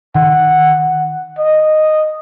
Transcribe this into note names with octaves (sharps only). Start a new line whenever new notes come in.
D#3 F#5
D#5